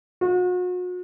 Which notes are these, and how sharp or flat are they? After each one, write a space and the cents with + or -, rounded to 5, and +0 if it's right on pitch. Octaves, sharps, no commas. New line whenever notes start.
F#4 -40